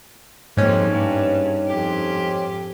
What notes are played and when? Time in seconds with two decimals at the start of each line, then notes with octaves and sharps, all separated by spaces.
0.57 F2 G#2 G3 A#3 C#4
0.92 G2
1.67 F2 G4